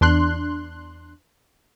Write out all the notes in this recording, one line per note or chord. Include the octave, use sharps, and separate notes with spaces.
E2 D4 C6 F#6